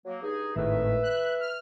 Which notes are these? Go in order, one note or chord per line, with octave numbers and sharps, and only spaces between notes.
F#3 A#3
G2 D#4 G#4
G#1 A2 D#3 B4 E5
F#6
F6